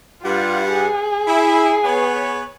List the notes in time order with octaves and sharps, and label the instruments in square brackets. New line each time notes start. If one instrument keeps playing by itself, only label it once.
[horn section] G2 G3 F#5 [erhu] F4
[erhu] G#4
[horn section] E4
B3 B4 C#5